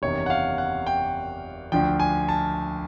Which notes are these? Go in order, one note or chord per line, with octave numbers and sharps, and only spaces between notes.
F#1 E2 C3 D#3 C#5
F#5
F5
F#5
G5
D2 D3 F3 G5
G#5
A5